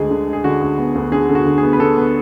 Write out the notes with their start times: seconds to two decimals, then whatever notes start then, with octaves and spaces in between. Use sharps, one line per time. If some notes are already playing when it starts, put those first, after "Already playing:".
Already playing: D2 G#3 G#4
0.11 D3
0.28 G#3
0.33 G#4
0.44 D3 F#4
0.61 D2
0.78 B3
0.95 D2
1.12 D3 G#4
1.29 D3
1.35 F#4
1.45 D2
1.58 G#4
1.63 B3
1.73 B4
1.79 D3 A4
1.97 B3